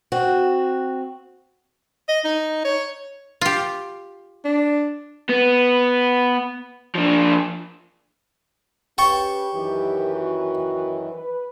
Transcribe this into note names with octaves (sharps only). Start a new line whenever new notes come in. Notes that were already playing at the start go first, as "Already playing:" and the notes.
C4 F#4
D#5
D#4
C#5
F4 G4
D4
B3
F3 D4
C#4 G4 B4 G5 A5 C#6
F#2 D#3 E3 G4
F#4
B4